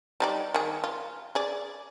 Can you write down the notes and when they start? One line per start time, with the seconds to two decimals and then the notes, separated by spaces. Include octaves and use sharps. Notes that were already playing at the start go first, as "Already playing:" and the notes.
0.20 G3 D#4 D5
0.54 D#3 G#4
0.84 F4
1.35 G#4 D5